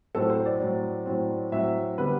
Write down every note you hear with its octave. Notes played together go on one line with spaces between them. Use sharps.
A2 F#3 C4 A4
C5
D5
A2 F#3 C4
A2 F#3 C4
A2 F#3 C4 E5
D3 G3 B3 B4